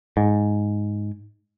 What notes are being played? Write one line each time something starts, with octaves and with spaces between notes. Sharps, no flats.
G#2